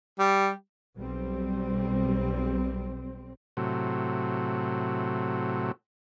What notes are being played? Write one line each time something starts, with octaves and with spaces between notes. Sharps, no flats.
G3
B1 G3 C4
A2 C3 F#3